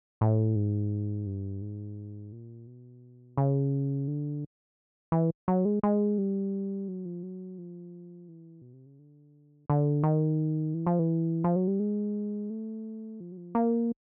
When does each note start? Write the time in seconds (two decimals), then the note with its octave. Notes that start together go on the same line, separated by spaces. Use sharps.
0.21 A2
0.56 G#2
1.26 G2
1.62 G#2
2.32 A#2
2.67 B2
3.37 C#3
4.08 D3
5.12 E3
5.48 F#3
5.65 G#3
5.83 G#3
6.18 G3
6.88 F#3
7.05 F3
7.23 F#3
7.58 F3
8.28 E3
8.61 B2
8.73 C3
8.86 C#3
8.99 D3
9.70 D3
10.03 D#3
10.74 E3
10.86 F3
10.99 E3
11.44 F3
11.56 F#3
11.67 G3
11.80 G#3
12.50 A3
13.20 F3
13.32 F#3
13.37 F3
13.55 A#3